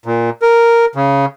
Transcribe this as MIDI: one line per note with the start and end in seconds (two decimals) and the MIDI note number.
0.06 0.30 46
0.42 0.85 70
0.95 1.25 49